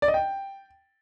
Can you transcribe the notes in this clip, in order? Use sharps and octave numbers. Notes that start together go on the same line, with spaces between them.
D5
D#5
G5